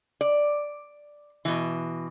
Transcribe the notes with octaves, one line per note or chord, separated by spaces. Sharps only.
D5
B2 E3